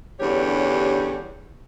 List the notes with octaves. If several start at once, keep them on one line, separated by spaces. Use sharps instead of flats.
E2 G2 D3 C#4 G4 C#5